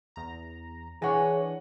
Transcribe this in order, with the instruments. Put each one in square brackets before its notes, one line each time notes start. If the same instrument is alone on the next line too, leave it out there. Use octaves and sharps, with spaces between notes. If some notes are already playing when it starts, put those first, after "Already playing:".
[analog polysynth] E2 A#5
[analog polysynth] E3 D4 [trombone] G#4 [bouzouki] C#5 G#5 [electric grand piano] F#5 A#6